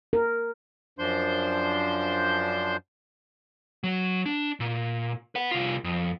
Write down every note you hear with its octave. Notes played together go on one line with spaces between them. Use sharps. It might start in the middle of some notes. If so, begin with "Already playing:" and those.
A#4
F#2 F3 D4 C5 C6 G6
F#3
D4
A#2
B4 F#5
C2 F4
F2